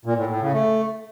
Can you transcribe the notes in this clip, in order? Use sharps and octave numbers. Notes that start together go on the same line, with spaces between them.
A#2
A2
A2
C#3
A3